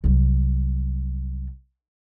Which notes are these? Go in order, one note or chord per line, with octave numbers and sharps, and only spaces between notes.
C2 F#3